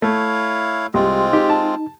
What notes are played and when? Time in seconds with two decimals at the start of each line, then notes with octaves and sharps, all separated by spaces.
0.02 A3 E4 C#5 F5
0.94 C2 G#3 C4 F4 G4
1.33 D#4 G4
1.49 A5